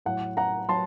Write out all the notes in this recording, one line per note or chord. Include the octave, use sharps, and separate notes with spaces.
A2 F#3 F#5
F#5 A#5
F#3 A5 C6